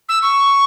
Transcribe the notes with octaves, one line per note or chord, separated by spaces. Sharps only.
E6
C#6